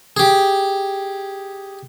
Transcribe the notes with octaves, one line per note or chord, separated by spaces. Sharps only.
G4 G#4